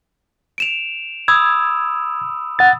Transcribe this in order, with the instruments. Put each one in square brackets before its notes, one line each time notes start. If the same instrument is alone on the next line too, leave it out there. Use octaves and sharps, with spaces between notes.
[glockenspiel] D7 E7 F7
[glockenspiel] B5 D#6 E6 [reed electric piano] G#6
[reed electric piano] F#5 A6